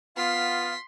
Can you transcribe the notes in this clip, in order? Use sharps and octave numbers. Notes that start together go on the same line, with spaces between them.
B3 F4 F5 C6 B6